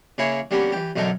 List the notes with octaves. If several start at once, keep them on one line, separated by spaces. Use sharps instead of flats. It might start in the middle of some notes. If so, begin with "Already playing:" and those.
C#3 A#3 E4 G#4 C#5
D3 G3 A#3 B3 C#4
E3 G4
B1 F#2 D3 D#4 A4 A#4